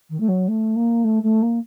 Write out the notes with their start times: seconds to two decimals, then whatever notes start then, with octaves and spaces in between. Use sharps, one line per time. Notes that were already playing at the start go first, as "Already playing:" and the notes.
0.10 D#3
0.20 A3
0.28 F#3
0.48 A3
0.76 A#3
1.04 A3
1.23 A3
1.42 A#3